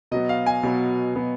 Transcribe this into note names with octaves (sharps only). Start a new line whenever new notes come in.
B2 F#3 B3 D#5
F5
G#5
B2 F#3 B3
B2 F#3 B3